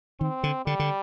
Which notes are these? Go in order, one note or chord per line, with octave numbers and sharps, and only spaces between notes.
D#3 C4
D3
D3 G3
D3